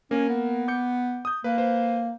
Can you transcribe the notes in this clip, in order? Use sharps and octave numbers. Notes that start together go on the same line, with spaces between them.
A#3 C#4 A#4
B3
D6 G6 C#7
D#6 G6
A#3 B4
B4 C5